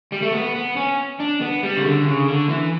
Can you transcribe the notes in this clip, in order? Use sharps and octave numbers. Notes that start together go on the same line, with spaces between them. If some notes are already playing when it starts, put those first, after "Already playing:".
G3
A3
B3
B3
C#4
D4
B3
G3
C#3
D3
C#3
D3
E3